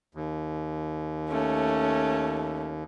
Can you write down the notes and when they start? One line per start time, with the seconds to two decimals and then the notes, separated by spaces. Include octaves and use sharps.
0.15 D#2
1.30 A3 C#4